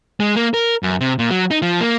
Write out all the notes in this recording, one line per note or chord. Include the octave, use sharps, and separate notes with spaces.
G#3
A#3
A#4
F#2
C3
A#2
F#3
D#4
F3
A#3